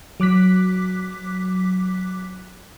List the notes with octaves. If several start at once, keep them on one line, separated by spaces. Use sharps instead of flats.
F#3 D6 F#6 B6